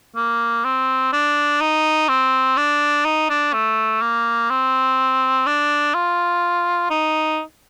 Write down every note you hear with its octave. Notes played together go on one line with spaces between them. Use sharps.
A#3
C4
D4
D#4
C4
D4
D#4
D4
A3
A#3
C4
D4
F4
D#4